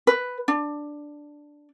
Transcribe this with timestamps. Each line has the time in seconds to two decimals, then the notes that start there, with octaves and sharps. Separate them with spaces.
0.07 B4
0.48 D4